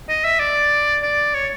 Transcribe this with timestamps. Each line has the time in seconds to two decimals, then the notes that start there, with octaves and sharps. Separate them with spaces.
0.09 D#5
0.24 E5
0.40 D5
1.02 D5
1.34 C#5